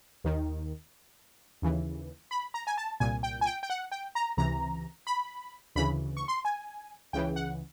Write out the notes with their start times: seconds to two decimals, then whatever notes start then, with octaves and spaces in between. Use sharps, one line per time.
0.24 D#2 D#3
1.62 D#2 C#3 E3
2.31 B5
2.54 A#5
2.67 G#5
2.77 A5
3.00 C2 A#2 G#5
3.23 G5
3.41 G#5
3.46 G5
3.63 G5
3.70 F#5
3.92 G5
4.15 A#5
4.37 C#2 C3 E3 A#5
5.07 B5
5.75 D2 C#3 E3 B5
6.17 C#6
6.28 C6
6.45 G#5
7.13 C#2 C#3 E3 G5
7.36 F#5